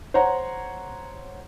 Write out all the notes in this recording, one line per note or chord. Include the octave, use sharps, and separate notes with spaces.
C5 C#5 F#5 A#5